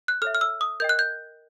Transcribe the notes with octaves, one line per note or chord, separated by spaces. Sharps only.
F#6
A4 C#5 E5 F6
F6
E6
D#6
A#4 D#5 G5 G6
F#6
G6